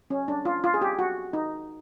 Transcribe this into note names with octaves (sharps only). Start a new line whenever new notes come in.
C#4
D4
F4
F4
G#4
G4
F#4
D#4